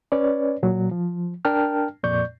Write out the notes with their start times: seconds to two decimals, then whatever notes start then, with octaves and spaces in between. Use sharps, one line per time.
0.12 C#4 B4 C#5 D5
0.63 A#2 F#3
0.91 F3
1.45 D4 A#4 G5 A5 F6
2.04 F2 A#2 D5 C#6 G6